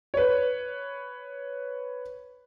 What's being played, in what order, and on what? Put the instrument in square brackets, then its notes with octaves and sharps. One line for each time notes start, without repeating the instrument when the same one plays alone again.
[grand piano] B4 C#5